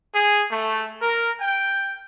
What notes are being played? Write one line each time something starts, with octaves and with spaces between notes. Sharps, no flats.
G#4
A3
A#4
G5